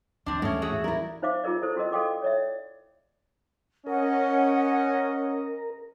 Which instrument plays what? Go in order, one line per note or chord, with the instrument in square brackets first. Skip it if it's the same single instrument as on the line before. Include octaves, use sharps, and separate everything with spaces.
[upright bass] D#2 E3 [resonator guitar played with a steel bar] C4 D4
[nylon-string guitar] A2 [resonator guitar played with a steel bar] G#3 C#4
[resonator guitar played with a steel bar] F#4 G#4 E5
[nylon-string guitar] E4 A#4 [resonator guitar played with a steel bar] D5
[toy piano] D#4 C5 E5 F5 D6
D#4 F4 G#4 A#4 D5
E4 A4 C5
C#4 F#4 G#4 A#4 D#5
A4 D5 F5 G5 C6 D6
C#5 D5 E5
[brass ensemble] C#4 D#5 [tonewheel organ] A#4 [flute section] F#5